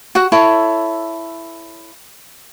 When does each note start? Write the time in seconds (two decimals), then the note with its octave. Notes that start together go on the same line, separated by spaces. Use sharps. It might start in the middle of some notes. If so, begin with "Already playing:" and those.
0.15 F#4 F#5
0.32 E4 A4 C#5